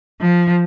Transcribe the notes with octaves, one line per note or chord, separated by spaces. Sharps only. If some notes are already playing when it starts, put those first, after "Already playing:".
F3